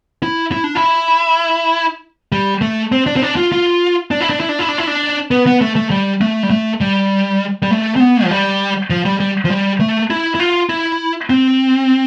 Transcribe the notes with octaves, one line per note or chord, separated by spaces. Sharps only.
E4
E4
D4
E4
G3
A3
C4
D4
C4
D4
F4
F4
D4
E4
D4
E4
D4
E4
D4
E4
D4
B3
B3
A3
A3
G3
A3
G3
A3
G3
G3
A3
C4
B3
F3
G3
F3
G3
G3
F3
G3
A3
E4
E4
F4
E4
C4